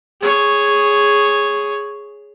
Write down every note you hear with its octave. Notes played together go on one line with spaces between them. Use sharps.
G#4 C#5